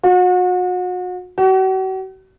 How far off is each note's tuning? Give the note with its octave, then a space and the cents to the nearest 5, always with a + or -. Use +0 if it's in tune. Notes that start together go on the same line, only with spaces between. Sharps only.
F#4 -35
F#4 +40